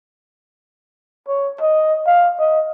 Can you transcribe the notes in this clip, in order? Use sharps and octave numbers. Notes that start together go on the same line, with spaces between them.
C#5
D#5
F5
D#5